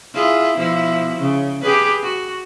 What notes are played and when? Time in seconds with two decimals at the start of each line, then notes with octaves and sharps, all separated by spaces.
0.14 E4 F4 G#4
0.58 B2 F3 E4
1.20 C#3
1.61 G4 G#4 B4
2.03 F#4